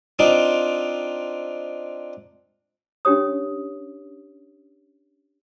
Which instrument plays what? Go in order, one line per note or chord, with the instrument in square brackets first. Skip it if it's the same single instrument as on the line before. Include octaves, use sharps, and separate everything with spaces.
[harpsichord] C4 D4 D#4 F4
[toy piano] C#4 D4 G4 C#5 D#6